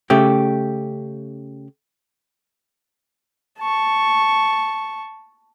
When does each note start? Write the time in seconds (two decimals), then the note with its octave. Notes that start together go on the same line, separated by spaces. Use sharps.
0.10 C#3 A3 G4
3.60 A5 C#6